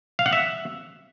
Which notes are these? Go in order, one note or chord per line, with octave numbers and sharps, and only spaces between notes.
F5
F#5
E5